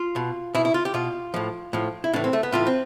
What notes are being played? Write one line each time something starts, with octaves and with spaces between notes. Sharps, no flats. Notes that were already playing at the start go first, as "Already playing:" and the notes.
Already playing: F4
B2
B2 E4
E4
F4
G4
B2 F4
A2 F3
A2 F3
E4
A2 E3 D4
C4
A3
B3
A2 E3 F4
C4